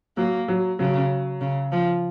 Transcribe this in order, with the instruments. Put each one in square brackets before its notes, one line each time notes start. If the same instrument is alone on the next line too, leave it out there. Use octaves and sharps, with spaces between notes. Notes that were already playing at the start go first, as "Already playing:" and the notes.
[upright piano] F#3 [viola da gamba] A#3
[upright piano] F#3
[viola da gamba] C#3 [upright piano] F#3
[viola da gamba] C#3
F3